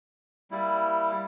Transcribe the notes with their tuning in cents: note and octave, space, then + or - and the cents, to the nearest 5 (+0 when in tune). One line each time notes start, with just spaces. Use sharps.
G3 +0 A#3 +0 E4 +0